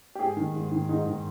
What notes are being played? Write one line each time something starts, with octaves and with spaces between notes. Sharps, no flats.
G4
G#2 G#4
D#3
G#2
D#3
G#2 D#4
D#3